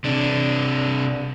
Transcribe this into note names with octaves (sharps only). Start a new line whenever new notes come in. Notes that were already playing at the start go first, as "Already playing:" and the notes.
C3 D4